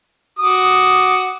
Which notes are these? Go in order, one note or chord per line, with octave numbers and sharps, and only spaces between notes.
F#4 D6 D#6